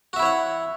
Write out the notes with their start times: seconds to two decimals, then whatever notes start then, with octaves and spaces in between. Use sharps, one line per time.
0.13 F#4
0.16 E5
0.19 E4
0.22 C#5
0.25 F#5